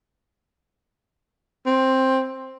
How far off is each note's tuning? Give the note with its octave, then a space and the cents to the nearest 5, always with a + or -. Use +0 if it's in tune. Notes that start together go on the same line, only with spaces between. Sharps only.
C4 +10